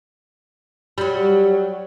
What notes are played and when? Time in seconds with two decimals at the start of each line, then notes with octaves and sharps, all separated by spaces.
0.98 F#3 G3